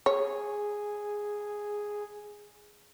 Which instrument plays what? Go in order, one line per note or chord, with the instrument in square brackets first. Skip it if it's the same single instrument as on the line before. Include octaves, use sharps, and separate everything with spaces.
[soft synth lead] G#4 [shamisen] C#5